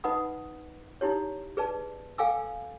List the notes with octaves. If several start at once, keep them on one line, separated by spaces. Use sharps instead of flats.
D#4 B4 D#5 F#5 B5 D#6
D#4 E4 G4 C#5
G#4 B4 D5 A5
A4 F5 G5 G#5 D6 E6